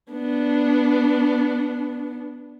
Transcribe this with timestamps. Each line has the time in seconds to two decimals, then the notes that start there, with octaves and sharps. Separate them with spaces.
0.13 B3 D4